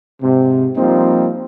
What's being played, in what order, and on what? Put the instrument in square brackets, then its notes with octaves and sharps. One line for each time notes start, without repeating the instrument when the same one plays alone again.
[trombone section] G#2 C3
F3 G3 A#3 C4 D#4